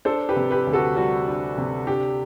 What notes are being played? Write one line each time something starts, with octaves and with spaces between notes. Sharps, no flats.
D4 A4 C5
G4 B4
C3
G4 B4
D2
F#4 A4
G3 F#4
D4
C3
D4 G4